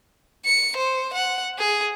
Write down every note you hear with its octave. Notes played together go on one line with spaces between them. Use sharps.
C#7
C5
F#5
G#4